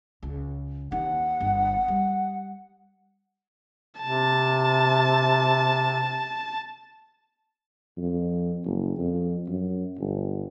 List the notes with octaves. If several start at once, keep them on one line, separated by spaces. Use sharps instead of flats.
C#2
D#2 D#3 F#5
G1
G3
C3 A5
F2
F#1
F2
F#2
G1